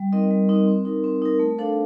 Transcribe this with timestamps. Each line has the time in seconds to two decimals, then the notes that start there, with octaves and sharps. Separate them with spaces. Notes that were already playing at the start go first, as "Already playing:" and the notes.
Already playing: G3
0.12 C4 D#4 A#4 D#5
0.31 G3
0.49 C4 D#4 A#4 D#5
0.67 C4
0.85 D#4 A#4
1.04 C4
1.22 D#4 A#4
1.39 A3
1.58 D4 A4 C5 F5